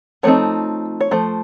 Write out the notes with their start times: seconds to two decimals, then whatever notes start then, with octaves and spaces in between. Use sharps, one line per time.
0.23 F3 A3 C4 D#4 C#5
1.01 C#5
1.11 F3 A3 C5